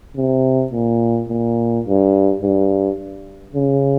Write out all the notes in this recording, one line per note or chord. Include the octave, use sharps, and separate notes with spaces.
C3
A#2
A#2
G2
G2
C#3